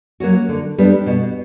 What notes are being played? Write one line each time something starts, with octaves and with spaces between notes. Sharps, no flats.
F#3 A#3 C#4 F#4
D3
G3 B3 D4
B2